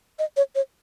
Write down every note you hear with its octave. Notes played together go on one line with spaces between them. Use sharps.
D#5
C#5
C#5